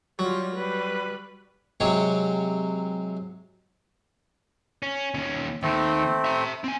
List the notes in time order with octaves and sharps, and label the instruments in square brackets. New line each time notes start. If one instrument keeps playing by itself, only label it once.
[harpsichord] F#3 [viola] G3 F4
[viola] G3 B4
[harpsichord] C3 F#3 G#3 C#5
[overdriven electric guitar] C#4
D#2 C#4
[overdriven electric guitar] D#2 D#3 [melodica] A3 C4
[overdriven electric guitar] E5 A#5
C4 G#5